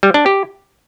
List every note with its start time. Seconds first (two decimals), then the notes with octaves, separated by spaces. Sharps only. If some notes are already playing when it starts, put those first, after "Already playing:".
0.03 G3
0.14 D4
0.26 G4